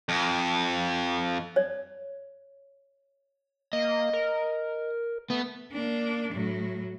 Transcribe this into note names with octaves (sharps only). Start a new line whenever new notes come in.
F2
C#5 D5
A#3 D#5
A#4
A3 B3
A#3 D4
A2 F#3